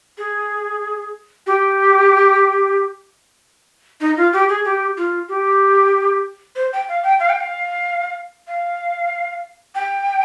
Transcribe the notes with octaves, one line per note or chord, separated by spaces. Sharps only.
G#4
G4
D#4
F4
G4
G#4
G4
F4
G4
C5
G5
F5
G5
F5
G5
F5
F5
G5